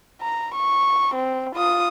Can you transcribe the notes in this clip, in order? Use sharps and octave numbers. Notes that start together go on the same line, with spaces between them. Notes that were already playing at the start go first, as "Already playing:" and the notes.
A#5
C#6
C4
F4 D#6